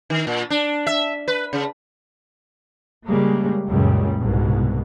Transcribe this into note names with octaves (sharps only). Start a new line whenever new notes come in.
D#3
A#2
D4
E5
B4
C#3
C#3 G3 G#3 A#3
C#2 F#2 A#2 C#3 G3
C2 G#2 B2